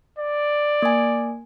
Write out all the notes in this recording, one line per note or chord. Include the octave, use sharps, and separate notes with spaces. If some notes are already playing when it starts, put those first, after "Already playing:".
D5
A#3 G#5